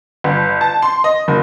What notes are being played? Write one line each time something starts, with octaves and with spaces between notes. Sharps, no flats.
G1
A5
C6
D#5
F#1